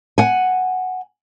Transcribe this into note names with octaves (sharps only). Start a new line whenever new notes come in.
F#5 G#5